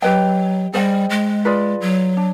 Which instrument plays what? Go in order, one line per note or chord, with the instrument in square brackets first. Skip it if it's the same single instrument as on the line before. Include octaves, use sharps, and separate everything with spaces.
[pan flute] F#3 [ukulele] G4 B4 D#5 G5
[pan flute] G3 [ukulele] G#4 C5 D#5 G5
[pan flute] G#3
[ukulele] F4 G#4 B4 D5
[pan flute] F#3
[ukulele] D4